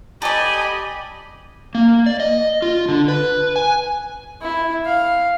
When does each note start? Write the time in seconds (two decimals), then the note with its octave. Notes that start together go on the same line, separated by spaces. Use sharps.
0.22 G4 A4 D5 D#5 G#5 B5
1.75 A#3
2.06 D5
2.20 D#5
2.62 F4
2.89 D3
3.08 B4
3.56 G#5
4.41 E4
4.85 F5